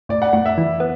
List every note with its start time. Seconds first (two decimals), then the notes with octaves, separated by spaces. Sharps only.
0.09 A2 D5
0.22 F#5
0.33 A2 F#5
0.46 E5
0.58 E3
0.80 B3